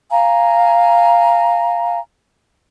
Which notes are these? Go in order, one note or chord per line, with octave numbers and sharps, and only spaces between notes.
F5 G#5 A#5